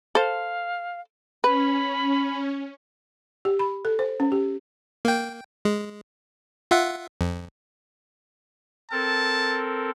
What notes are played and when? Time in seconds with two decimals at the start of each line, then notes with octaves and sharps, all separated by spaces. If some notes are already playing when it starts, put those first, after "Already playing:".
0.15 A4 C5 F5
1.44 C#4 B4 B5
3.45 G4
3.59 B5
3.85 A4
3.99 C5
4.20 C#4
4.32 G4
5.05 A#3 G5
5.65 G#3
6.71 F4 E5 F#5
7.21 F2
8.91 C4 A4 A#4 A5